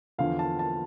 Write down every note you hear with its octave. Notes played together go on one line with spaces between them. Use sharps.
E2 D3 F3 F5
A5
A5